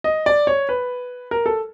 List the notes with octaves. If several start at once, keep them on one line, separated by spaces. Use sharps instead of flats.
D#5
D5
C#5
B4
A#4
A4